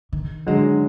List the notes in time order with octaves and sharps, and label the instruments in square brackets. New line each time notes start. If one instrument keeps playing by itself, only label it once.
[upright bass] D#3
[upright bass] D3 [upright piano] F#3 G#3